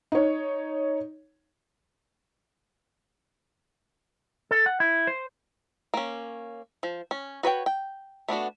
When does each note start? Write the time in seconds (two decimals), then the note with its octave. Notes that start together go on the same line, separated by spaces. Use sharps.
0.12 D#4 C#5
4.51 A4
4.66 F#5
4.80 E4
5.07 C5
5.94 A#3 C#4
6.83 F3
7.11 C#4
7.43 F#4 B4 C#5 G5
7.66 G5
8.28 A3 B3 D4 F#4